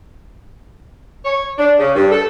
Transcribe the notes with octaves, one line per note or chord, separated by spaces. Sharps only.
C#5
D4
C#3
G2
A4